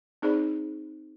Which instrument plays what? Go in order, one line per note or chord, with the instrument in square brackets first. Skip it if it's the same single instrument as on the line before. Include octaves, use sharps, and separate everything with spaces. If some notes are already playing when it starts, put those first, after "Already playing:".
[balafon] C4 D#4 G#4 C5 D5 B5